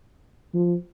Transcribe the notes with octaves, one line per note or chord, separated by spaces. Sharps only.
F3